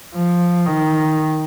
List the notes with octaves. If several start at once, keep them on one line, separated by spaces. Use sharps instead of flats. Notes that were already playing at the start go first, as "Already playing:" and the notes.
F3
D#3